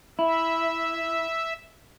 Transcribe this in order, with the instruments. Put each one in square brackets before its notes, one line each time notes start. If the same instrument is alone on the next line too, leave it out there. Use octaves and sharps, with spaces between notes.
[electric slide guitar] E4 [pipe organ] E5